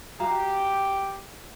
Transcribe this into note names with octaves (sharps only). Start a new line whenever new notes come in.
F#4 G4 F5 A#5